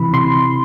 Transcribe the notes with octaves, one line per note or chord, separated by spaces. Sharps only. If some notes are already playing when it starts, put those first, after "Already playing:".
Already playing: C3 E3 B5
C3 C6